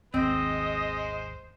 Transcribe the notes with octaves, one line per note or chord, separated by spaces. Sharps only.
G#1 D#2 G#3 C4 C5 D#5